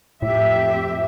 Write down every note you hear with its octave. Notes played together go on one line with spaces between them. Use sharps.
F2 A2 G4 E5